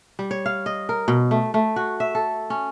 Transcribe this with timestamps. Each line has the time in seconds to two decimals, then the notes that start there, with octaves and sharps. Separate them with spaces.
0.19 G3
0.31 C#5
0.46 F5
0.66 D#5
0.89 A#4
1.08 B2
1.31 A3
1.54 A3
1.76 F#4
2.00 E5
2.15 A4
2.50 C#4